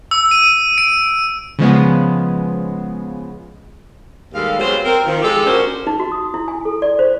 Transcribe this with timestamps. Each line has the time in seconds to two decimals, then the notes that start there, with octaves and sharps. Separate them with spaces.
0.11 E6
0.31 D#7
0.78 D7
1.59 C#3 F3 G#3 B3
4.34 D#2 G3 G#3 A4 F5
4.59 F#3 G#3 B3 C4 C5
4.85 C4 A#4
5.06 D#3 F3
5.21 G#3 G4 A4
5.45 A#2 C#4 D4 F#4 A#4 C5
5.87 D#4
6.00 F#4
6.12 D#6
6.34 E4
6.48 G#5
6.65 A4
6.82 D5
6.99 C5